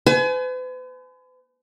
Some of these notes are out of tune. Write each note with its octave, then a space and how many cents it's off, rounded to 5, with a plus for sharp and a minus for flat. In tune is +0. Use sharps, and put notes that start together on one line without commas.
B4 +45 G#5 +35